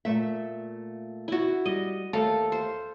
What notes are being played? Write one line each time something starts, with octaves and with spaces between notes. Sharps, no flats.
A#2 A3 E5
E4 F#4
G3 D#5
D#2 A3 A4 F5
C5